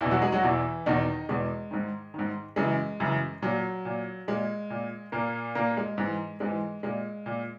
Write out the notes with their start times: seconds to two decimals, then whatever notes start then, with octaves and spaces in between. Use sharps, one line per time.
0.01 E2 B2 E3 E4
0.11 F#3 F#4
0.22 G#3 G#4
0.32 F#3 F#4
0.43 E2 B2 E3 E4
0.86 E2 B2 D#3 D#4
1.29 E2 B2 G#3
1.71 G#2 D#3
2.14 G#2 D#3
2.56 F#2 C#3 E3 G#3
3.00 F#2 C#3 E3
3.42 A#2 F#3
3.85 A#2
4.28 A#2 G#3
4.70 A#2
5.12 A#2 A#3
5.55 A#2 A#3
5.77 G#3
5.98 G#2 E3
6.40 G#2 E3 G#3
6.83 A#2 G#3
7.26 A#2